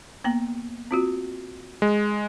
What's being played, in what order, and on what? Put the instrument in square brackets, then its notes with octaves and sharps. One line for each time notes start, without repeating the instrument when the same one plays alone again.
[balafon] A#3 B3 G5
C4 F4 F#4
[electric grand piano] G#3